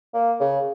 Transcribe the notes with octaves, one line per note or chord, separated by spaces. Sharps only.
A#3
C#3